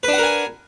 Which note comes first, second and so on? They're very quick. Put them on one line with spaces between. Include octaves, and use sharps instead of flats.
B4 D4 F#5 A#4 G#5